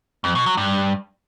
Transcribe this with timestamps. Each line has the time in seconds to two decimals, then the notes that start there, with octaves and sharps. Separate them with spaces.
0.24 F2
0.35 B2
0.46 F#3
0.57 G2